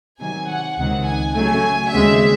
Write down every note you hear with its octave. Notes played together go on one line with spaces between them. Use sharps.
C3 D#3 F#3 G#5
F#5
C#2 C3 D#3 F#5
G#5
C#3 F#3 A3 G#5
D#2 C#3 G#3 C4 E5